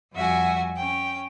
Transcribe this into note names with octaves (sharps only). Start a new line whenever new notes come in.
F2 G3 F#4 E5 F#5 G#5
C#4 G5